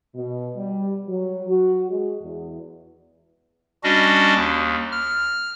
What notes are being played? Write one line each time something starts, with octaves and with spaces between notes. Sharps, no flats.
B2
G3
F#3
F#4
G#3
E2
G3 C#4 D4 F#4 D#5
D#2
F6